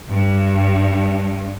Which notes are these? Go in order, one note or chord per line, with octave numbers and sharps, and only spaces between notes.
G2